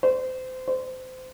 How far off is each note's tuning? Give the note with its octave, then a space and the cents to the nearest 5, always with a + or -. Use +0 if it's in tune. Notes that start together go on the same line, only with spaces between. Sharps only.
C5 -25
C5 -25